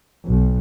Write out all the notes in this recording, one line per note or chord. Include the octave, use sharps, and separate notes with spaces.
B1